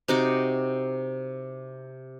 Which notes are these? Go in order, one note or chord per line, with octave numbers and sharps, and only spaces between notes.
C3 D#4 F#4 D6